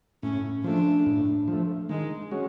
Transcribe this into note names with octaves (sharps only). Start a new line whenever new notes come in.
A2 C#4
F3 A3 D4
A2
F3
A3
D#3 G#3
G#3 C#4 F#4